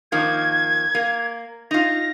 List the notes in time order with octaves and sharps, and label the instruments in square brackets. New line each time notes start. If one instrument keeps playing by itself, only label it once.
[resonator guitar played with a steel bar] D#3 F3 A#3 [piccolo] G#6
[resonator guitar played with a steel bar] A#3
[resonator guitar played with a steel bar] D#4 F4 [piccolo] A#6